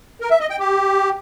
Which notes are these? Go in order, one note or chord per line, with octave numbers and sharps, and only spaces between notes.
A#4
E5
D#5
G5
G4